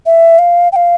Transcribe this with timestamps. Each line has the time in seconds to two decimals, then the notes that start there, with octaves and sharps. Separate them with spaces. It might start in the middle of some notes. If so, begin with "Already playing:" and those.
0.06 E5
0.39 F5
0.72 G5
0.76 F5